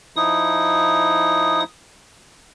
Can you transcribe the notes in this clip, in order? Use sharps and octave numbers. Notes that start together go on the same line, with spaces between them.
F3 D#4 E4 D#6